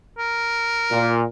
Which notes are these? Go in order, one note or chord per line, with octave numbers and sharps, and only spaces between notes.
A#4
A#2